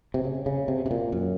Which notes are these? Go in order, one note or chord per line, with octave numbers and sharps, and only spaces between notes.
C3
C#3
C#3
C3
C3
A#2
F#2